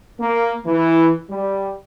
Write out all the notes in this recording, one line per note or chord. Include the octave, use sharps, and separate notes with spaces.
A#3
E3
G3